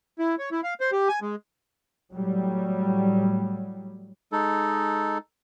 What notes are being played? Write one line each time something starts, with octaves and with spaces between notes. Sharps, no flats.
E4
C#5
E4
F5
C5
G4
G#5
G#3
A2 F#3 G3
G#3 D#4 A4